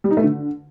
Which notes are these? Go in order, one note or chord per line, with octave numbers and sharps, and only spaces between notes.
G3
D#4
A3
D3